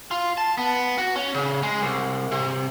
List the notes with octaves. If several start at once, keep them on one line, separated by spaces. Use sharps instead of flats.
F4
A5
B3
F#4
C#4
C#3
G#3
C2
C3